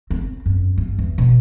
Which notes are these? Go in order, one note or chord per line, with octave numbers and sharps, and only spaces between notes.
C4
F#2
G2
E2
B2